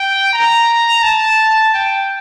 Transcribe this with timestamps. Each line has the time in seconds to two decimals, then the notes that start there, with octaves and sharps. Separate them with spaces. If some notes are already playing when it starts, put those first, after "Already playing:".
Already playing: G5
0.33 A#5
1.03 A5
1.74 G5